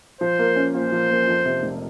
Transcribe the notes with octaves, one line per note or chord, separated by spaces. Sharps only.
F3 C5
A#3
C#4
A#2 C5
F3
A#3
F2
C3
F1